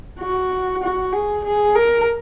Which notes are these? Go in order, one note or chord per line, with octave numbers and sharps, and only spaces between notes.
F#4
F#4
G#4
G#4
A#4